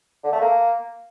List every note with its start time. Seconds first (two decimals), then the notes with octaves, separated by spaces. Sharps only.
0.24 D3
0.33 A3
0.41 A#3